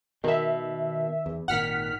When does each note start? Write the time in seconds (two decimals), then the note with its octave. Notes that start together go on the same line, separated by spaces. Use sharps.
0.24 B2 D#3 E5
1.26 E2
1.48 G#1 A#2 D#3 F#5 F6 B6